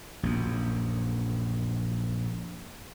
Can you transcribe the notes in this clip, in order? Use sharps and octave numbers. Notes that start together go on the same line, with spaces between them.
A#1 F#2